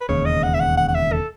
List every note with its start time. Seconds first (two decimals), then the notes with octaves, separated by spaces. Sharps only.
0.01 B4
0.08 E1 D#2 C#3 C#5
0.26 D#5
0.43 F#5
0.54 E5
0.60 F#5
0.78 F#5
0.88 F#5
0.95 E5
1.12 A4